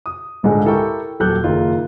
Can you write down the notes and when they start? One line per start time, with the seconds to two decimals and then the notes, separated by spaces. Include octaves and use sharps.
0.06 D#6
0.43 C#2 G#2 D3 G#3
0.65 E4 G4 A4 A#4 G5 C#6
1.20 D#1 F#3 G4 A4 F#6 G6
1.44 F#1 D#3 F4